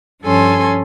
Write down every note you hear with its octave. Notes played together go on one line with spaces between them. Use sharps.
G2 F3 C#4 A4 G#5 C6